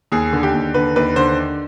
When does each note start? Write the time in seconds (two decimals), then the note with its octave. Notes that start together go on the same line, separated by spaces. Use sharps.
0.12 D#2 G#4
0.33 D3
0.43 G4
0.53 D#2
0.74 D3 B4
0.96 D#2 B4
1.16 D3 C5